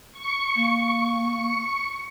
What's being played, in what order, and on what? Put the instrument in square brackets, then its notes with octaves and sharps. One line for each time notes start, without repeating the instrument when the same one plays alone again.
[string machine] C#6 C#7
[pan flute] A#3